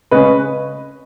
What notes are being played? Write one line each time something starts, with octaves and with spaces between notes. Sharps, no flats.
C#3 G#3 C#4 B4 D#5